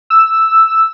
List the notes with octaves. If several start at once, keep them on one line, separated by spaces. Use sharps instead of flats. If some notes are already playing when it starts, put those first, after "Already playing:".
E6